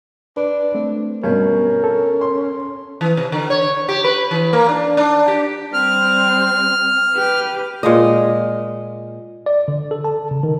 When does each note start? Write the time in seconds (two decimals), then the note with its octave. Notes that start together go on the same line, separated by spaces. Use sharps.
0.37 D4 B4
0.75 A3 C4
1.24 G2 B2 C#4 A#4
1.84 A4
2.21 C6
3.01 E3
3.17 C3
3.32 D3
3.50 C#5
3.89 G4
4.04 B4
4.31 E3
4.53 A#3
4.69 D4
4.97 D4
5.28 G4
5.73 G3 C4 F6
7.14 G4 B4
7.83 A#2 G#3 D#5
9.46 D5
9.68 D3
9.91 A4
10.04 A5
10.31 C#3
10.43 D#3